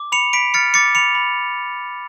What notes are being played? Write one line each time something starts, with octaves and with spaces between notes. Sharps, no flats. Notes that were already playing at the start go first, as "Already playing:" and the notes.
Already playing: D6
B5 C#7 F7
B5 B6 D7
F6 A6 C#7
D6 A6 C#7
B5 C#7 F7
B5